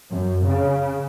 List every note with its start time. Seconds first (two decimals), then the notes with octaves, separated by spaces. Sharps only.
0.10 F#2
0.46 C#3